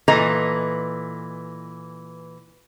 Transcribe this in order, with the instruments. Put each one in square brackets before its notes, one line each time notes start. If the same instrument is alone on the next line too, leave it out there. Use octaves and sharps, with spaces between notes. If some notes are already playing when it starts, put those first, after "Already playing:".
[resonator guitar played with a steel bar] A#2 E3 A4 B4 D#5 A#5